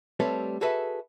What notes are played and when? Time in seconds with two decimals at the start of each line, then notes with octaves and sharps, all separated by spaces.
0.20 G3 A3 C4 A4 B4 C#5
0.61 F#4 G#4 A4 B4 E5